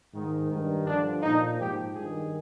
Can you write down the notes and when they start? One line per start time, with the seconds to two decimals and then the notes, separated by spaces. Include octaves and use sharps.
0.13 G#2 D#3
0.49 G2 D#3
0.86 G2 D3 F3 D4
1.22 A#2 F3 D#4
1.59 G#2 F3 G4
1.95 G2 D#3 G#4